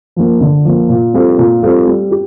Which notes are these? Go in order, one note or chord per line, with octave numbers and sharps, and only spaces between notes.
F3 A#3
D3
F3 A#3
A#2
G3 C4 F4 A4
A#2
G3 C4 F4 A4
G3
G4